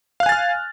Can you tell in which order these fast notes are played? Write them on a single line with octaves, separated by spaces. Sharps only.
F5 F#6 G#5 A6 F6